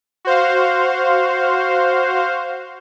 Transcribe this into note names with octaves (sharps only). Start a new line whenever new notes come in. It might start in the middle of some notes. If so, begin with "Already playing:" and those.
F#4 C5 F5